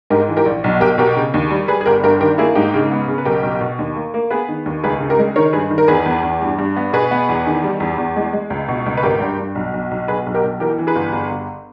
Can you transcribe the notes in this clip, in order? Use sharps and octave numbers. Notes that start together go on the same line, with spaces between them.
G#2 G4 A#4
E3
G4 A#4
A#1
B1
B1 G4 A#4
B2 G4 A#4
C#3
D#2
G3
G3 G#4 B4
G#4
G1 G4 A#4
G2 G4 A#4
D#3 G4 A#4
A#3 E4 G#4
G#2 D#4 G4
C#3
B3
C#3
B4
B1 G4 A#4
B1
B2
D#2
A#3
A#3
B3 G#4 B4
D#3
D#2
C#2 G#4 B4
C#3
G4 A#4
G#3
D#3 A#4 C#5
G2 G#4 B4
D#3
A#4
E2 G#4 B4
E2
E2
G2
G2
B3
B2 G#4 B4
B3
E2
D#3
G3
E2
E2
G#3
G#3
C#2
B2
C#2
B4
G#1 G4 A#4
G2
G2
B1
B1
B1
B1 G#4 B4
B1
G4 A#4
B1
E3 G4 A#4
E3
G#4 B4
G1
G1
G1